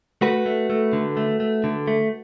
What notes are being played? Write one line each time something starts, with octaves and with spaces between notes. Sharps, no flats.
A3 F#4 B4
A3
A3
D3
A3
A3
D3
A3